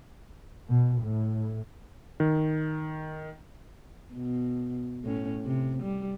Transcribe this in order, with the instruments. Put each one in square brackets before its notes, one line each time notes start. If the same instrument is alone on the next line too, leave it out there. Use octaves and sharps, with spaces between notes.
[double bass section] B2
A2
[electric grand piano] D#3
[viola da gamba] B2
A2 C#4
C3
G3